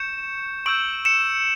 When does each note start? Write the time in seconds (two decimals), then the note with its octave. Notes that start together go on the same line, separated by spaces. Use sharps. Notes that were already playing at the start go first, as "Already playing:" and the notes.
Already playing: C#6 G6 C#7 E7
0.66 C#6 E6 G6 D7 F#7
1.05 C#7 E7